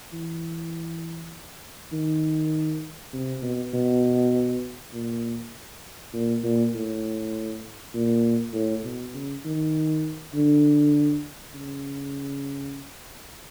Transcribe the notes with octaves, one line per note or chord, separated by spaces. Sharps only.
E3
D#3
C3
B2
B2
A#2
A#2
A#2
A2
A#2
A2
B2
C#3
D#3
D3
C#3